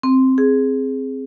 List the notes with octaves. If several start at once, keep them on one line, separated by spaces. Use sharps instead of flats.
C4
G#4